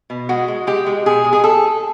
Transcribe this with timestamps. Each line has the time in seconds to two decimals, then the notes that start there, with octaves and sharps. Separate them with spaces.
0.10 B2
0.29 G#3 F#4
0.48 G#3
0.67 G#3 G4
0.86 G#3
1.06 B2 G#4
1.24 G#3
1.33 G#4
1.44 A4